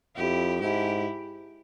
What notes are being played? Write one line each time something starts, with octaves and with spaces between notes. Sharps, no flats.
F2 E4 G4
G#2 E4 G4